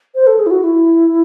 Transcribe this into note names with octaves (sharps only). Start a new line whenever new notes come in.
C5
A4
G#4
E4
F#4
E4